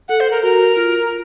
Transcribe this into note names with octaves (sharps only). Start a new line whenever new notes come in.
A4 F#5
C5
A#4
F#4 A#4
F4